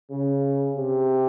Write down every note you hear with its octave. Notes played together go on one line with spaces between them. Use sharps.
C#3
C3